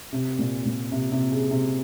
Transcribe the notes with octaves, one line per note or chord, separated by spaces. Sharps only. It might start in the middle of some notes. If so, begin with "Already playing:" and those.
C3
A#2
A#2
C3
C3
C#3
C3